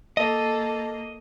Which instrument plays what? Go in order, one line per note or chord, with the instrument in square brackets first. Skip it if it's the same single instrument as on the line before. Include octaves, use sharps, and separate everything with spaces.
[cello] A#3 [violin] A4 [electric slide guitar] D#5